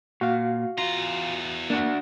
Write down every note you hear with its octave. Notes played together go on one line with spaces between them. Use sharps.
A#2 F#4 F5
E2 F4 A#5
A#3 D4 F#4